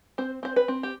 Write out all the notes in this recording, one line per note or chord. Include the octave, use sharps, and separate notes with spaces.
C4 C5
C4 C5
B4
C4
G4